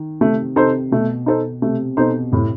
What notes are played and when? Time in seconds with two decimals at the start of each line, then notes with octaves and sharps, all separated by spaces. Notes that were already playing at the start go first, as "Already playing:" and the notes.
Already playing: D#3
0.21 C3 A3
0.56 C3 D#4 A4 C5
0.91 B2 A3
1.26 D#4 A4 C5
1.62 C3 A3
1.97 B2 D#4 A4 C5
2.32 A2 C3